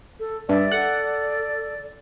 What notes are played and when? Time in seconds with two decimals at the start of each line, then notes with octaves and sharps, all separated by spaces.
0.20 A4
0.49 G2 D5 E5
0.71 A4 F#5